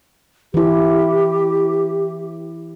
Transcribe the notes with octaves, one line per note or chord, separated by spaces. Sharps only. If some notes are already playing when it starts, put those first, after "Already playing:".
E3 E4 G4